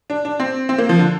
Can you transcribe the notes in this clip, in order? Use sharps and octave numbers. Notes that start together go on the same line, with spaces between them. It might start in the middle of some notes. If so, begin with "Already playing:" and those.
D4
D4
C4
C4
A#3
F3
D3